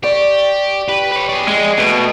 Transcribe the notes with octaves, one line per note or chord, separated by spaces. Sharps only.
G4 D5 C#6
G4 B4
B4 C#5
G#4 D5
G#3
B2 A3